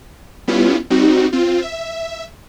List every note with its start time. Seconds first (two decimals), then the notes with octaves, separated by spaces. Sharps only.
0.48 G3 B3 C#4 E4 F4
0.90 G3 C4 D#4 F#4
1.33 C4 F4
1.62 E5